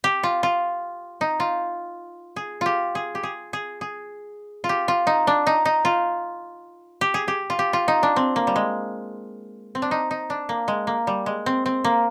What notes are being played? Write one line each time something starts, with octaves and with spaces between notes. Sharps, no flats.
G4
F4
F4
D#4
F4
G#4
F4 G4
G#4
G4
G#4
G#4
G#4
F4
G4
F4
D#4
D4
D#4
D#4
F4
G4
G#4
G4
F4
G4
F4
D#4
D4
C4
A#3
G3
G#3
C4
D4
D#4
D#4
D4
A#3
G#3
A#3
G3
G#3
C4
C4
A#3